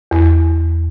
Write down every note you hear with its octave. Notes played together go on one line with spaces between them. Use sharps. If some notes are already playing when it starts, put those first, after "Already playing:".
E2